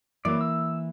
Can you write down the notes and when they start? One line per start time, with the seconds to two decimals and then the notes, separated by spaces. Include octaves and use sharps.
0.25 E3 F#3 A#3 E4 D5
0.41 E6